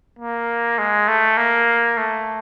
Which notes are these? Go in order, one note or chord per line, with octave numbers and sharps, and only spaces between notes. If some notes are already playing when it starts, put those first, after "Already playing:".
A#3
G#3
A3
A#3
A3